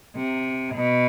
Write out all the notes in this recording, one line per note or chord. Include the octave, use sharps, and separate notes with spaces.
C3
B2